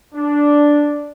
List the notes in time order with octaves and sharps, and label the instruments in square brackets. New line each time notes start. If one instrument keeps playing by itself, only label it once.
[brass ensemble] D4